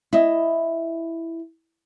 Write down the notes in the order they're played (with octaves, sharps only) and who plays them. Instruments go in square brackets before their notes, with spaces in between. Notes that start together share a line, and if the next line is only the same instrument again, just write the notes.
[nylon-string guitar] E4 D#5